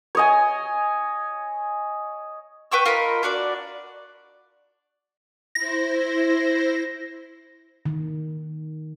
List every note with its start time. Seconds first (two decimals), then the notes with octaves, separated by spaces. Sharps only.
0.15 C#5 D#5 G#5
2.72 B4 G5 C#6 E6
2.85 F4 A#4 D#5 B5
3.23 D4 F#4 D5
5.55 E4 C5 A#6
7.86 D#3